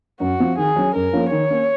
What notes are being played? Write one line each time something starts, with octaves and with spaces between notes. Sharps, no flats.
F#2 F#4
F3 C4
D#3 G#4
F#3 C#4
F#2 A#4
F3 A#3 C#4
D#3 C#5
A#3 C#4